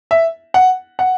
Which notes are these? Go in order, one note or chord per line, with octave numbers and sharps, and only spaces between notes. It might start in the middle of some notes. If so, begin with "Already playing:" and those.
E5
F#5
F#5